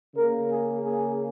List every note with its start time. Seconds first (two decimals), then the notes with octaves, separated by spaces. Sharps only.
0.15 C#3 A#3 A#4
0.49 G#4
0.83 G#4